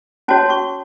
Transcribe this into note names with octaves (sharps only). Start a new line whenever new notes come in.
C#4 F#4 C#5 A5
C#6